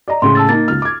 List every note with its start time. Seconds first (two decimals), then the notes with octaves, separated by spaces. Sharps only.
0.08 D5 D#5 A#5
0.22 A2 C#3 G#3 C6
0.35 A5 E6 A6
0.49 A#3 D#4 A6
0.68 C#2 F6
0.82 D6 G#6